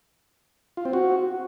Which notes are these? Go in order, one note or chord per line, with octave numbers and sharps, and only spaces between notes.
F4
C4
F#4